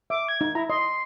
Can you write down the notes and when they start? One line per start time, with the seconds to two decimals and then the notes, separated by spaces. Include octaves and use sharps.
0.10 E5 D6
0.28 G#6
0.41 D#4
0.55 E4 A#5
0.70 D#5 C6